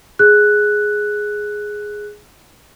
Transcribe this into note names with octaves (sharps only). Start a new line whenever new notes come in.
G#4 F#6